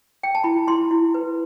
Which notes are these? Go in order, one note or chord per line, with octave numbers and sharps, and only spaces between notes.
G5
A5
E4 B5
E4 C6
E4
B4